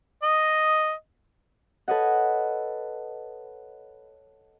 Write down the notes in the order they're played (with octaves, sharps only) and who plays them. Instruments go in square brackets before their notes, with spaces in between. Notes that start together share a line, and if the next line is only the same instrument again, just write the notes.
[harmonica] D#5
[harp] A4 B4 C#5 D#5 F#5